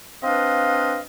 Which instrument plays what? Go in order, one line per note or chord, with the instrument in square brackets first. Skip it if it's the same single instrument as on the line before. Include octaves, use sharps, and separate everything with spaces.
[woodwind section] C4 D4 B4 D#5 F5